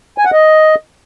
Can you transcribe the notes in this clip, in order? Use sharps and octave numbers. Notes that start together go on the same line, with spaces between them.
G#5
F#5
D#5